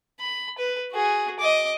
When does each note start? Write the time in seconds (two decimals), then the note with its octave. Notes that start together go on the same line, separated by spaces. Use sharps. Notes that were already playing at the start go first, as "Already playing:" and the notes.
0.20 B5
0.58 B4
0.92 F#4 G#4
1.39 D#5 D6